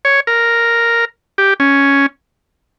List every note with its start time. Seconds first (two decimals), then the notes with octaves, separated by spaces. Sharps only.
0.05 C#5
0.27 A#4
1.38 G4
1.60 C#4